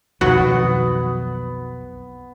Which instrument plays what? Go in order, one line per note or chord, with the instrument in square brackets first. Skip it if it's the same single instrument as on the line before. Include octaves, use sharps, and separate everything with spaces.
[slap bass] B1 F2 D#3 [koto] F#3 F#4 [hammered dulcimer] B3